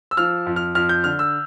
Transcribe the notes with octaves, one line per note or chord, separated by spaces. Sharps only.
E6
F3 F6
F2
F6
F2 F6
G6
D3 F6
E6